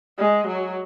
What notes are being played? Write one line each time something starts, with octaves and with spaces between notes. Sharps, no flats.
G#3
F#3